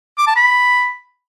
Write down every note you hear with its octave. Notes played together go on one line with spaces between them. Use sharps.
D6
A5
B5